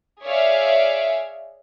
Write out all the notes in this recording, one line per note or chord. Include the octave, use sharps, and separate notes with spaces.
G#4 C#5 D5 E5 F5